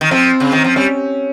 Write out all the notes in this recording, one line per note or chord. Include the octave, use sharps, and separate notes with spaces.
D#3
F3 C4
C#3
D#3
F3
G3 C#4